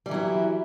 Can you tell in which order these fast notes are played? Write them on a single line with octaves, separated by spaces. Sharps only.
G3 E3 F#3 E4